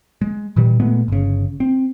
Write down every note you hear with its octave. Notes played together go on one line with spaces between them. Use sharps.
G#3
A#2 D#3 E3 G3
A#2 G#3 A3 B3
G1 C#3
C4